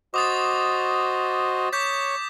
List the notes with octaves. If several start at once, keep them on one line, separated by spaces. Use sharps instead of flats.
F#4 C5 D#5 D6 D#6 A6
C#5 D6 G6 B6